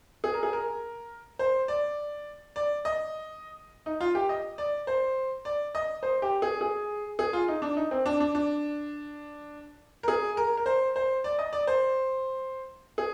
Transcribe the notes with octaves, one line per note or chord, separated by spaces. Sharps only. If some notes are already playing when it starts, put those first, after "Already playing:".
G#4
A#4
G#4
A#4
C5
D5
D5
D#5
D#4
F4
G4
D#5
D5
C5
D5
D#5
C5
G4
G#4
G#4
G#4
F4
D#4
D4
D#4
C4
D4
D4
D4
A#4
G#4
A#4
A#4
C5
C5
D5
D#5
D5
C5
G#4